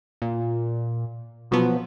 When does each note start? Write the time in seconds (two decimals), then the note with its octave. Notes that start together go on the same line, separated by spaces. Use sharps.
0.22 A#2
1.51 B2 F3 F#3 B3